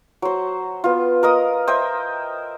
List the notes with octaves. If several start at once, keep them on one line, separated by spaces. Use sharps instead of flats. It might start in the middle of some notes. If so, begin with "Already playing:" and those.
F#3 C5
B3 F4
A#4 D#5 D#6
C5 D#5 E5 G5